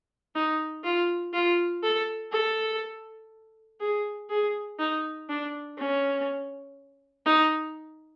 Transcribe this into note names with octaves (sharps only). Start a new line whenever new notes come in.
D#4
F4
F4
A4
A4
G#4
G#4
D#4
D4
C#4
D#4